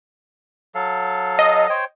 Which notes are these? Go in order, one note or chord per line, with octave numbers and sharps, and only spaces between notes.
F#3 A4 F5
D#5
C5 C#5 G5